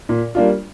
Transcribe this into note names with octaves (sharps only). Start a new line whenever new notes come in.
A#2
G3 A#3 D4 F4